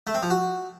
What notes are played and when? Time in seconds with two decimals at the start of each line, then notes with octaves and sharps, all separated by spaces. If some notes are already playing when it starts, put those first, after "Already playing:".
0.07 A3
0.15 C4
0.22 F3
0.30 F#4